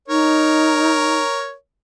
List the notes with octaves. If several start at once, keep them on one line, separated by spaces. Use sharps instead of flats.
D#4 A#4 C#5